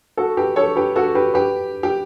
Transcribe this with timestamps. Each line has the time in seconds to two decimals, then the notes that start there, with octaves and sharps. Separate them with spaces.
0.17 F#4 A4
0.37 G4 B4
0.56 A4 C#5
0.76 G4 B4
0.96 F#4 A4
1.15 G4 B4
1.34 G4 B4
1.83 G4